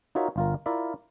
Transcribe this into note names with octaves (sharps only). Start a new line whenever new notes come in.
D#4 F4 F#4 A#4 C#5 E5
G1 F4 A#4
E4 F4 A#4 D5 E5